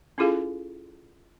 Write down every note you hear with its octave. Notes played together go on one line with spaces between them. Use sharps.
C#4 E4 F4 G#4 A4 F5